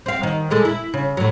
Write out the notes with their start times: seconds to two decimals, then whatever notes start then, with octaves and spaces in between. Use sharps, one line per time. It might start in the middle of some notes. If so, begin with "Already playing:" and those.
0.06 C4 F5
0.23 D#3
0.50 A#2 G#3 A4
0.65 E4
0.94 C#3
1.17 A2 F#3